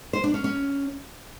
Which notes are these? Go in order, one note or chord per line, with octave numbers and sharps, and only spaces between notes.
C5
D4
C#4
C#4